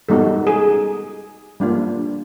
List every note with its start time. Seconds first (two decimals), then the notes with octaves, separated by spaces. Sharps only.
0.09 G3 B3 D#4 F#4 A4
0.47 G#4
1.60 G3 A#3 D4 F4